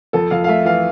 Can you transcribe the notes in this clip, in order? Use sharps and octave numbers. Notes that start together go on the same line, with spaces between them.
F2 A4
F2 F5
F5
A3 E5
E3 F5